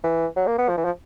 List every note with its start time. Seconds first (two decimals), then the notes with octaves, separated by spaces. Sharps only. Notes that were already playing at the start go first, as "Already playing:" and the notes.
0.04 E3
0.37 F#3
0.47 A#3
0.58 B3
0.69 F3
0.78 E3
0.85 F3